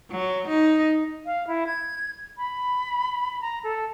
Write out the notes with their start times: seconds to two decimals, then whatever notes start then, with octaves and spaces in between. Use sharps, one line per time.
0.11 F#3
0.48 D#4
1.26 F5
1.47 E4
1.67 G#6
2.38 B5
3.41 A#5
3.64 A4